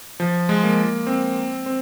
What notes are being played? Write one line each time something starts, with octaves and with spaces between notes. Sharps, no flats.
F3
G#3
A#3
C4
C4